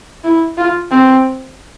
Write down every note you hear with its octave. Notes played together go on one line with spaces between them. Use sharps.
E4
F4
C4